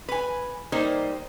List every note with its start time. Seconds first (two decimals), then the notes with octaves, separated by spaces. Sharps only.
0.09 B4 G#5
0.72 G3 A#3 D#4 C5